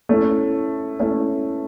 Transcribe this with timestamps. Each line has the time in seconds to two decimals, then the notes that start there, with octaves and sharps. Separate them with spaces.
0.09 A3 C#4 E4
1.00 A3 C#4 E4